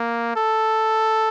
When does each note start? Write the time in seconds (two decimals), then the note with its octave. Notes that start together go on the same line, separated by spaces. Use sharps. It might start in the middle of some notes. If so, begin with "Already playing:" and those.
Already playing: A#3
0.36 A4